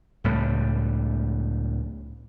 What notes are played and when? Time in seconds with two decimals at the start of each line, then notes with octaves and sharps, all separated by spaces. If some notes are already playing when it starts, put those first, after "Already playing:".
0.24 C#2 A2 G3